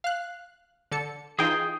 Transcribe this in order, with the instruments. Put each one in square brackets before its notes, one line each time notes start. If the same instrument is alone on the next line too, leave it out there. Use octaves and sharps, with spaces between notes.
[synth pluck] F5 F#6
D3 A4 C#7
[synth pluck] E3 D#4 F4 [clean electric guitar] G#4 G5